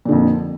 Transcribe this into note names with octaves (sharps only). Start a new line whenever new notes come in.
F2 A#2 D3